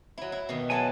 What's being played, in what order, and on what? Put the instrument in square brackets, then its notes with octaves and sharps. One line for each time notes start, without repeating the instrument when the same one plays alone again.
[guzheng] F#3 E4
E4
B2 D#3
[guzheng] F#3 E4 A4 [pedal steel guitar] G#5 A5